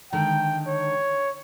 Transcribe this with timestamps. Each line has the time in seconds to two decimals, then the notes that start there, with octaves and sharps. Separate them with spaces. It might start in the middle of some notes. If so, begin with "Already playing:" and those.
0.12 D3 D#3 G#3 G5
0.67 C#5